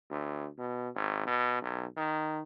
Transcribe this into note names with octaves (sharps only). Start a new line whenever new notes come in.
D2
B2
G#1
B2
B1
D#3